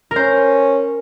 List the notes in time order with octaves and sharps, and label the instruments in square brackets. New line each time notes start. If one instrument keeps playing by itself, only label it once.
[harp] A#4
[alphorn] C#4 [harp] C5